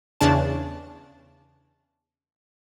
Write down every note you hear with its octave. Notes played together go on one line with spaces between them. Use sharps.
E2 C#3 D4 A5